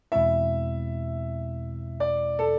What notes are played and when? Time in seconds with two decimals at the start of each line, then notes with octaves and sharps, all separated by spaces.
0.12 E2 B2 G#3 C4 E4 E5
2.00 D5
2.39 A4